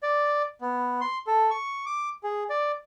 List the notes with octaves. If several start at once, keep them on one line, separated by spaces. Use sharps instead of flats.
D5
B3
C6
A4
C#6
D6
G#4
D5